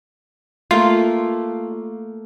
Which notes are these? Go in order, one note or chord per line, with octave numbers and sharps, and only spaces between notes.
A3 A#3 F4